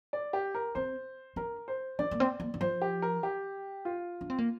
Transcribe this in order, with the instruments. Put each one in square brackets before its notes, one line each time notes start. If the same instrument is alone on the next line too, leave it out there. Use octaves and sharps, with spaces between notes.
[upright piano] D5
G4
A#4
[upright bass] C4 [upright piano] C5
[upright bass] D4 [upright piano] A#4
[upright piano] C5
[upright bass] D4 [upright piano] D5
[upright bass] A#3
C4
A#3
D3
[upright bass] F3 [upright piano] C5
[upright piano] G4
A#4
G4
F4
[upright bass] D4
C4
A#3